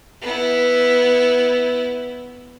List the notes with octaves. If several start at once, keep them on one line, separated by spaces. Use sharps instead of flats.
B3 E4